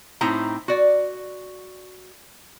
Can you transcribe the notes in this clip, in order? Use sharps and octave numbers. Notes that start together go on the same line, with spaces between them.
A2 C4 D#4 E4 A#5
F#4 D5